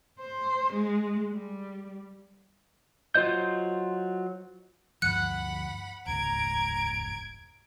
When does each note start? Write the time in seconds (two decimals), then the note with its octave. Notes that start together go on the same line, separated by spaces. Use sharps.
0.20 C5
0.73 G#3
1.30 G3
3.15 F#3 F4 C5 D#5 G6
5.02 D2 G2 F3 F#5 B5 F#6 C#7
6.06 E1 C#2 G#2 A#5 G#6 D7